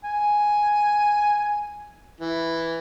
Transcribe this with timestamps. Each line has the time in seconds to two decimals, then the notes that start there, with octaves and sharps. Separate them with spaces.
0.04 G#5
2.20 E3